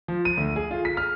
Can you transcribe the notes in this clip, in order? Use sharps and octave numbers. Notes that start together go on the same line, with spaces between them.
F3
D#7
D2
G#4
F4
B6
F6